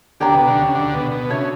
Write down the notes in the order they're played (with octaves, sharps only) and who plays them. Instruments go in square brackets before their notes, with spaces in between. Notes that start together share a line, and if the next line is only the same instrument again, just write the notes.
[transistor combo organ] D2 D3 [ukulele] G4 C#5 G5 A#5
[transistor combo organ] B2
D2 D3
C#3
D2 D3
B2
B2
[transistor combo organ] C#3 [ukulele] D4 F#4 C#5 E5